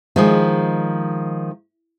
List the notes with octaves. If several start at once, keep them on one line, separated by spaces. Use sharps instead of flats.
D#3 F3 G#3